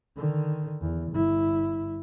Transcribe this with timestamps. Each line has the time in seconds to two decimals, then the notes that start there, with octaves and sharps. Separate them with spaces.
0.16 D3 D#3
0.81 E2
1.12 G1 E4